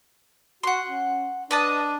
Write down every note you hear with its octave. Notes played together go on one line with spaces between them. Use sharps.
F#4 F#5 C6
C#4
D4 B4 D#5 A5